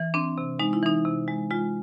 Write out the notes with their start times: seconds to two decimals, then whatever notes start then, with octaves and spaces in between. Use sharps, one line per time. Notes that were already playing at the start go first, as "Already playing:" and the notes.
Already playing: E3
0.14 C4 D4
0.38 C3
0.59 G#3 D#4
0.73 E4
0.83 E3 D#4
1.05 C3
1.28 G#3
1.51 G#3 F4